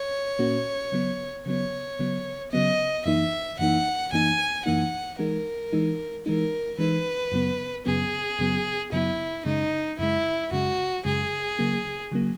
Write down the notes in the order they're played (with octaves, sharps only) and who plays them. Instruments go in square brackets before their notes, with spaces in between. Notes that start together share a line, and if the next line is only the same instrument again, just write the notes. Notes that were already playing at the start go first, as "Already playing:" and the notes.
Already playing: [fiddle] C#5
[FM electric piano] A#2 A#3 C#4 F#4
C#3 F#3 B3
[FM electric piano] C#3 F#3 B3 [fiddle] C#5
[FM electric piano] C#3 F#3 B3
[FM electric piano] C#3 F#3 B3 [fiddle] D#5
[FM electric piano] F#2 E3 A#3 D#4 [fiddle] E5
[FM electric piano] F#2 E3 A#3 D#4 [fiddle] F#5
[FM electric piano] F#2 E3 A#3 D#4 [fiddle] G#5
[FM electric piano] F#2 E3 A#3 D#4 [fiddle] F#5
[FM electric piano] E3 G#3 D#4 [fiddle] A#4
[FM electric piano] E3 G#3 D#4
[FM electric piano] E3 G#3 D#4 [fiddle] A#4
[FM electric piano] E3 G#3 D#4 [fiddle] B4
[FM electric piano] F#2 C#3 F#3 B3
[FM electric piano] F#2 C#3 F#3 B3 [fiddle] G#4
[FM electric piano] F#2 C#3 F#3 B3
[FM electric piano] F#2 C#3 F#3 B3 [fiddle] E4
[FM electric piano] F#2 C#3 G#3 [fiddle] D#4
[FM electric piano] F#2 C#3 G#3 [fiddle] E4
[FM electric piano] F#2 C#3 G#3 [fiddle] F#4
[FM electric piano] F#2 C#3 G#3 [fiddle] G#4
[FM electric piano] C#3 F#3 A#3
C#3 F#3 A#3